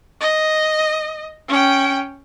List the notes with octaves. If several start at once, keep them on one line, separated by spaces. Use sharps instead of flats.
D#5
C#4 G5